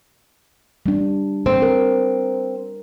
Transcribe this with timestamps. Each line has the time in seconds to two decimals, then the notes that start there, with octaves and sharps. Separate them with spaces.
0.86 G3 D4
1.46 C4
1.62 A#4